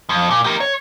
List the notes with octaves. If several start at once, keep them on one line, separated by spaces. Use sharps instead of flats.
F2
A#2
G4 A#4
C#5